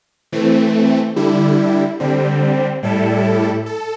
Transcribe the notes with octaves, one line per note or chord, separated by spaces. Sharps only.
E3 A3 C4
D3 G3 E4
D3 G3 C4
A2 G3 E4 A4
A4